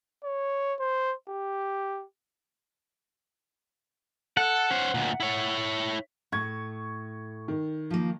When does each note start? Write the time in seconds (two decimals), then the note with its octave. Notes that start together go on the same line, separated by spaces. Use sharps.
0.24 C#5
0.79 C5
1.29 G4
4.37 A4 F#5
4.70 C#4 C5
4.94 D2 A#2
5.20 E4 C#5
6.32 A2 C#6 G#6
7.48 D#3
7.91 F3 A#3